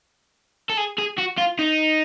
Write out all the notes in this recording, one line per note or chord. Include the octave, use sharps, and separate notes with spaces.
A4
G#4
G#4
F#4
F4
D#4